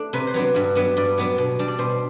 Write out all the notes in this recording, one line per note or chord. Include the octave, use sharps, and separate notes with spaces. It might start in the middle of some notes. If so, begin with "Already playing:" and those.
Already playing: A3 D4 A4
C3 B4
C5
F#3 B3 D4
G2 F#5
F#3 B3 D4 F#5
G2 D5
F#3 B3 D4
B2
G3 D4
D5
B2 C5